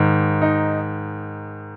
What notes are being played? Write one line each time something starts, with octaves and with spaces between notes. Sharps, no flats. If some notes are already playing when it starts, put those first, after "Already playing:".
Already playing: G#2 D#3
D#4